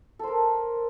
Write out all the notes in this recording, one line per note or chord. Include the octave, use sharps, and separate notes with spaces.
A4 A#4 C5